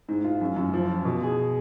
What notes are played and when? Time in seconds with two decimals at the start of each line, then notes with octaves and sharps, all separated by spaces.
0.08 G#2
0.24 F4
0.41 F#2
0.56 F#2
0.74 F3
0.89 F3
1.05 B2
1.22 G#4